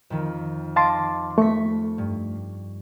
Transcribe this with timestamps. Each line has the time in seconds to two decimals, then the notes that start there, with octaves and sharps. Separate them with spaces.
0.10 F2 D#3
0.76 D#5 F5 A5 C6 D6
1.38 A3 C#6 B6
1.98 G2